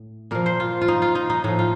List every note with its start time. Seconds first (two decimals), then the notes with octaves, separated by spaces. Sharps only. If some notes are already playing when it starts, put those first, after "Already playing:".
Already playing: A2
0.31 A#2 F3 A#4
0.46 C5
0.60 F4
0.82 F4
0.88 D#4
1.02 F4
1.15 D#4
1.30 D#4
1.44 A2 F3 D#4
1.59 F4